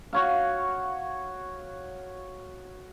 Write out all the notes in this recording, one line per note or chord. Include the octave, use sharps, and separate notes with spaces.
F#4 C#5 F5